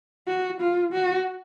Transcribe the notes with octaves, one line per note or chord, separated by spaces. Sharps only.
F#4
F4
F#4